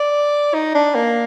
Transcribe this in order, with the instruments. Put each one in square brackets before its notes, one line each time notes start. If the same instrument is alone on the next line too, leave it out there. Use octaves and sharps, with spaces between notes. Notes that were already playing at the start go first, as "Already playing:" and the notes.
Already playing: [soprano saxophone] D5
D#4
D4
A#3